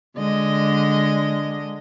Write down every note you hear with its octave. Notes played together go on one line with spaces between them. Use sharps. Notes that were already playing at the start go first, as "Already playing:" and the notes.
D3 G#3 D#5